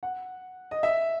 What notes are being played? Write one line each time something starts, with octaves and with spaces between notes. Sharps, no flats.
F#5
D#5
E5